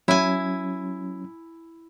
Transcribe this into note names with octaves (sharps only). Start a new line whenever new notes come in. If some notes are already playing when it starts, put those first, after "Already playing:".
F#3 C#4 E4 G#5